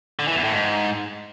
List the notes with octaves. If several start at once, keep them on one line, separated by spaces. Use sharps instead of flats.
D3
E3
E2
A2
G#2